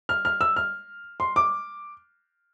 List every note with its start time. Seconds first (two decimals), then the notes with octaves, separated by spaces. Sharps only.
0.09 F6
0.25 F6
0.41 E6
0.56 F6
1.20 C6
1.36 D6